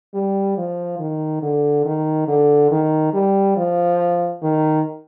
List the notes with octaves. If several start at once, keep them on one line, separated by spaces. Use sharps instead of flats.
G3
F3
D#3
D3
D#3
D3
D#3
G3
F3
D#3